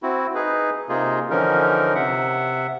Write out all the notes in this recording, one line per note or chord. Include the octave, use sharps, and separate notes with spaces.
C4 E4 F#4
D#4 G#4 B4
C3 A#3 D#4 F4 G#4
D3 E3 F3 C#4 D#4 A#4
C3 E5 F#5